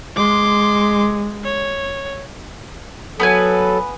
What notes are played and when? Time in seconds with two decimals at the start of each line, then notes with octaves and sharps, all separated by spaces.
0.16 G#3 C6 D6
1.44 C#5
3.20 F#3 B3 A4 B4 G#5